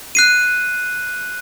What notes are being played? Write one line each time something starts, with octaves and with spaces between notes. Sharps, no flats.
F#6 C7 D#7